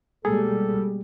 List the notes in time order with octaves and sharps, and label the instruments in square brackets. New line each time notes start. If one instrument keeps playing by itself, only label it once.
[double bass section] B2 G3 [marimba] G#3 A#3 [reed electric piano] G#4 [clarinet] A4